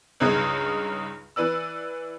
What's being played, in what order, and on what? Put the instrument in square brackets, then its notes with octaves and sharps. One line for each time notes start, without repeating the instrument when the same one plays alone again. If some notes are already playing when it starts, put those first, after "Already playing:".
[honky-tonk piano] C#2 G2 C#3 D#4 G#6
E3 B4 D5 E6